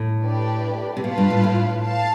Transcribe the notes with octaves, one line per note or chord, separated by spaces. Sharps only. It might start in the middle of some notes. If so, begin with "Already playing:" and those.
Already playing: A2
A3 D4 G4 B4 D5
C3
B2 F4 B4 F5 A5
G2
A2
A2
F5 A5